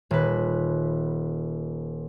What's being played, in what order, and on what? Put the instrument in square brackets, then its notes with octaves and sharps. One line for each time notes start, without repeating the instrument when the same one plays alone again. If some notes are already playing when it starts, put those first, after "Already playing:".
[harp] D#1 B4